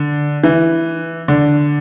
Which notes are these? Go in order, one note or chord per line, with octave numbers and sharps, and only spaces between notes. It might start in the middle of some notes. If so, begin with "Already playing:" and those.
Already playing: D3
E3
D3